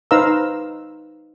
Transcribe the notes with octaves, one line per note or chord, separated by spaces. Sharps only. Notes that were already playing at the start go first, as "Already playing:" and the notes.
D#4 B4 C5 F5 A#5 E6